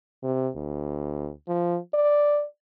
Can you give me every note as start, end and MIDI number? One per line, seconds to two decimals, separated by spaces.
0.23 0.50 48
0.56 1.31 38
1.48 1.79 53
1.94 2.45 74